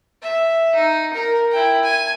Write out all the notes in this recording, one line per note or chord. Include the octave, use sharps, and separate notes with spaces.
E5
D#4
A#4
E4 G5
G#5